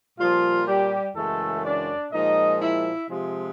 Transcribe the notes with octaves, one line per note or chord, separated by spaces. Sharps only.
A#2 F3 G3 F4
G3 G4
F#2 C#3 E3 G#3 A3 A4
D4 D5
A#2 F3 G#3 D#4 D#5
E4 E5
C3 F3 G#3